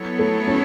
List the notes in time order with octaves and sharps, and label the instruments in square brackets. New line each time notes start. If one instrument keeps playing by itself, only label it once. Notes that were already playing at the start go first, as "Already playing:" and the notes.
Already playing: [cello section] F#3 B3 E4 A4 C#5
[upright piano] A3
C#4